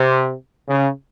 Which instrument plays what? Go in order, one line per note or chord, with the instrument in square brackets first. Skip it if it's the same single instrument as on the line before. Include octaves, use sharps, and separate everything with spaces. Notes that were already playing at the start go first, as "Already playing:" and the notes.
Already playing: [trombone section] C3
C#3